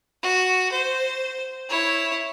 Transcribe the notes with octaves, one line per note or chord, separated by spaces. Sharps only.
F#4
C5
E4 C#5